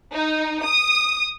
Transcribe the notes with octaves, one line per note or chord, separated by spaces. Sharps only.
D#4
D#6